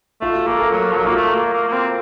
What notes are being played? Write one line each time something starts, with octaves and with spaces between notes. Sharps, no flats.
A3 F4
F#4
A#3 A4
A#4
F#3
F3
F#3 F#4
A#3 F4
A3 F#4
A#3
A#3
A#3
C4